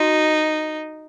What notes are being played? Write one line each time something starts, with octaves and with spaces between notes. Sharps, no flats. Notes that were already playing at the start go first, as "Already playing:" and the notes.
Already playing: D#4 F#4